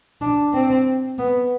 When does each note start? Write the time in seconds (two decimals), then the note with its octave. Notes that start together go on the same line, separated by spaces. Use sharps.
0.21 D4
0.54 C4
1.19 B3